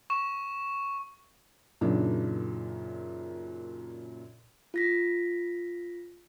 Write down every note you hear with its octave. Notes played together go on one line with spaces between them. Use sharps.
C#6 E7
F#2 A#2 C#3 D4 D#4
F4 A#6 B6